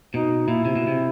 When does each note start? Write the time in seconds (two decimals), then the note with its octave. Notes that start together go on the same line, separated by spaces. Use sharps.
0.14 B2 D#4
0.47 A#2 E4
0.65 C3
0.76 B2
0.87 C3